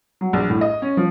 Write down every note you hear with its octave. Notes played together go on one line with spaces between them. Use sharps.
F#3
A#1
A2
D#5
C#4
F3